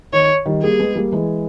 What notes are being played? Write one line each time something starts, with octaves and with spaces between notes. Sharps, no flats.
D#3 C#5
D#3 G3
G3 A#3 G#4
G#3 B3
G3 A#3
E3 G#3